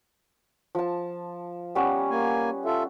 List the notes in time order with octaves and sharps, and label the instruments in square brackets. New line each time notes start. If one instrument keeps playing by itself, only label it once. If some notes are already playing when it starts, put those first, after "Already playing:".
[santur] F3 A5
G3 B3 C#4
[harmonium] A#3 G#5
F4 A4 E5